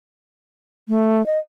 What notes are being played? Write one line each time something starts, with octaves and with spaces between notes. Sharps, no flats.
A3
D#5